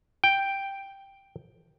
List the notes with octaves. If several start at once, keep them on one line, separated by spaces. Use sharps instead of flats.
G5